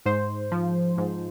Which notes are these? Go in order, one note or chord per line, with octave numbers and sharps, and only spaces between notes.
G#2 C5
F3
G#2